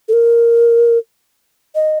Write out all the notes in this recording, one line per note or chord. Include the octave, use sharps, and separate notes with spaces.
A4
A#4
D#5